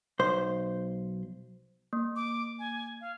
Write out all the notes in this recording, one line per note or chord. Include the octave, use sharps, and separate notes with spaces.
B1 C5
A#3
D6
G#5
F5